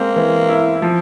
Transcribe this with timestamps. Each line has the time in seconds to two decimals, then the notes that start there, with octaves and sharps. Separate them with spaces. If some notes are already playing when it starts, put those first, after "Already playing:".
Already playing: G#3 A#3 C4
0.16 E3
0.49 E4
0.82 F3